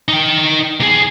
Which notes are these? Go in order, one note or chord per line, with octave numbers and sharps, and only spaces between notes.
D#4 G5
E2 G#4